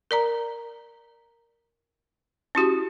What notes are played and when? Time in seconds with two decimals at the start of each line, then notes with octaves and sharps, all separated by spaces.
0.11 A#4 D5 A#5
2.55 C#4 E4 F#4 G4